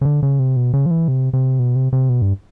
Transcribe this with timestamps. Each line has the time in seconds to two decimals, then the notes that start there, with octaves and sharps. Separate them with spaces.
0.01 C#3
0.05 D3
0.23 C#3
0.39 C3
0.56 B2
0.73 C#3
0.86 F3
0.91 E3
1.08 C3
1.33 C3
1.59 B2
1.75 C3
1.93 C3
2.09 B2
2.22 G2